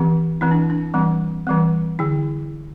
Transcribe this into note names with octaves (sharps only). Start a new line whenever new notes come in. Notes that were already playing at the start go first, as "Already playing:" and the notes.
Already playing: E3 C4 G4
E3 C4 E4
D4
D4
E3 G3 C4
E3 G3 C4
D3 E4